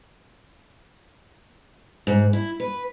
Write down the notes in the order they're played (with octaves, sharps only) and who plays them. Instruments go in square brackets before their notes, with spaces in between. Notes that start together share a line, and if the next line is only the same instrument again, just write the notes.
[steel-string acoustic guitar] G#2
E4
B4